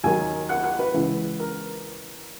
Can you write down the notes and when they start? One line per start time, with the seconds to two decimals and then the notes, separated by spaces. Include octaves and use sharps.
0.04 D#2 D#3 F#3 G#5
0.49 F#5
0.64 F#5
0.79 B4
0.94 C#2 C#3 E3
1.40 A#4